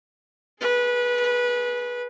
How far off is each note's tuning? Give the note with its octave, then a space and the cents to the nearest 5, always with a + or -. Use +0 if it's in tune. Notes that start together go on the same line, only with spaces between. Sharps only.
G#4 +25 B4 -20